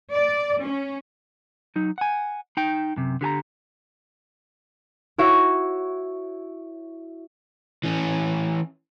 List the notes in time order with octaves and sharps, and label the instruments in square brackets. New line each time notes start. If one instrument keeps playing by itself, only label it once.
[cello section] D5
C#4
[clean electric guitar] F#3 D#4
F#5 G#5
D#4 G5
F#2 C3
D3 G4 G#5 A#5
[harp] E4 F#4 C#5 E5
[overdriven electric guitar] E3 C#4